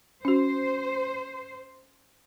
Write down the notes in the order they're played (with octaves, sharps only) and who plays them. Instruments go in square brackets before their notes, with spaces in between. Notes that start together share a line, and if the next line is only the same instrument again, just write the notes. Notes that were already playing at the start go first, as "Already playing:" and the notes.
[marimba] C#4 F#4 [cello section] C5